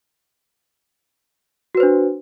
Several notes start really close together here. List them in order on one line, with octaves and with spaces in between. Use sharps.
F#4 B4 C5 D4